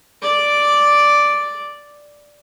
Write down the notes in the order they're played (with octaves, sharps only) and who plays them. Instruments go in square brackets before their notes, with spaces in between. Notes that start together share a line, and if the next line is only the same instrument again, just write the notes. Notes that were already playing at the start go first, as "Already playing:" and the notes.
[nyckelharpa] D5 D6